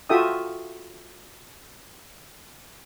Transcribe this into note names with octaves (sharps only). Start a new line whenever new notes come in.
F4 F#4 A4 E5 G5 D#6